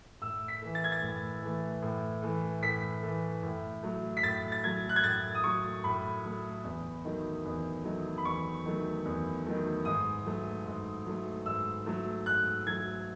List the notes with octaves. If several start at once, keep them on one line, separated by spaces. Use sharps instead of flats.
A2 E6
B6
E3 A3
A6
G#6
A6
A2
E3 A3
A2
E3 A3
A2 B6
E3 A3
A2
F#3 A3
B6
A2 A6
A6
F#3 A3 G#6
F#6
G#6
A2 A6
D#6
F#3 A3 C#6
A2 B5
F#3 A3
E2
D#3 F#3 A3
E2
D#3 F#3 A3
B5
E2 C#6
D#3 F#3 A3
E2
D#3 F#3 A3
G#2 D#6
F#3 A3
G#2
F#3 A3
G#2 E6
F#3 A3
G#2 F#6
F#3 A3 G#6